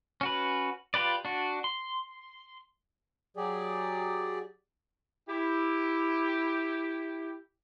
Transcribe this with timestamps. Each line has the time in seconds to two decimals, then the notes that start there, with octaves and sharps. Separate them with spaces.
0.21 C#4 F#4 B4
0.94 F4 G4 B4 D5
1.25 D4 F#4
1.64 C6
3.37 F#3 G4 G#4 D5
5.28 E4 G4